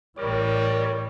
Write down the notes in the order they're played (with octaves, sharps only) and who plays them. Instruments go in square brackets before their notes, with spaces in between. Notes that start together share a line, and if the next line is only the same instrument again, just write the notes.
[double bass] A1 E4 [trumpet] G3 [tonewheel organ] A#4 D5 [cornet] C#5